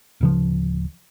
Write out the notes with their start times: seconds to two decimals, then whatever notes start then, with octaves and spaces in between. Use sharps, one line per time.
0.21 D1 C#3 F3